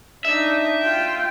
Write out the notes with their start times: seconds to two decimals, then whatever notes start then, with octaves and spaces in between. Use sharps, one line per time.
0.25 D4 D#4 E5
0.81 F4 G5